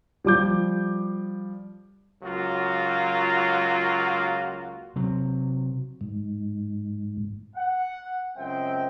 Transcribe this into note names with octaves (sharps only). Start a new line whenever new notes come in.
F3 G3 D6 G6
C#2 F#3 A#3 F4 F#4
C3 F#3
G#2
F#5
C#2 F#2 C4 D#5 E5 G5